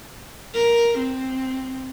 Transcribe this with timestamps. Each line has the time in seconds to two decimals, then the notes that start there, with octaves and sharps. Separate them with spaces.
0.54 A#4
0.99 C4